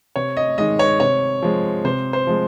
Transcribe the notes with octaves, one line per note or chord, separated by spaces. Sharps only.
C3 C#5
D#5
D#3 G#3 D#5
C#5
C3 C#5
F3 G#3
C3 C5
C5
F3 G#3